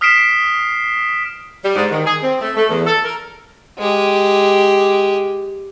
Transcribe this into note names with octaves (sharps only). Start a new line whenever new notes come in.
D#6 F6 B6 C7 D7 E7
G3
G#2
D#3
G#4
C4
A3
A3
E2
A4
A#4
G#3 G4